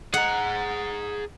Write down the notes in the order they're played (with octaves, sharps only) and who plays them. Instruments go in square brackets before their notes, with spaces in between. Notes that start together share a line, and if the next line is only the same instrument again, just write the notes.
[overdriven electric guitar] G#4 A#5 [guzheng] F#5